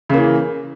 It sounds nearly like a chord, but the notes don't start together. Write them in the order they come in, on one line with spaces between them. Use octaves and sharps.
C#3 A#3 E3